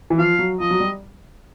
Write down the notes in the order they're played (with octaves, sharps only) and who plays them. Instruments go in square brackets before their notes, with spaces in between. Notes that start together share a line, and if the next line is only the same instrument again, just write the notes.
[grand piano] E3
[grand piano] F3 [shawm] F5
[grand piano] F#3
[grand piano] F3 [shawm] D#5
[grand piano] F#3
G3